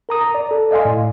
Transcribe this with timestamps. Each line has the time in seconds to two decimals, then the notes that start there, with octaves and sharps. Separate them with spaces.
0.09 A#4 A#5 D#6
0.21 A#5
0.35 D5
0.51 A4
0.71 D5 D#5 F5 G#5 C6
0.85 A2